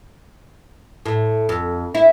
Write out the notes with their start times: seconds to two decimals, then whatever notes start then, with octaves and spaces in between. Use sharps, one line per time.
1.06 A2
1.49 F2
1.94 E4